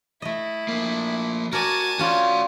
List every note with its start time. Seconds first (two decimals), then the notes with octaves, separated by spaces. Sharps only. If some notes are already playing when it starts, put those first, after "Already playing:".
0.22 A3 E4 D#5
0.68 F3 A#3
1.53 F#4 A#4 D5 G#5 A5
1.99 C#4 F4 F#4 C#5 D5